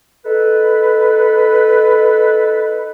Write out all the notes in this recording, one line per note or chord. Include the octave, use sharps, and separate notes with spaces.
D#4 A4 B4